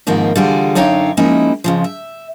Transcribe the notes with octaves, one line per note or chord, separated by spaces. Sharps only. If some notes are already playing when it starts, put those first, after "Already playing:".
G#2 B2 D#3 F3 A#3 C4
D3 E3 G3 F4 F#4 G#4
F#2 D3 D#4 C#5 F5 G5
F3 G#3 A#3 C#4 D#4 E4
F2 C#3 F3
E5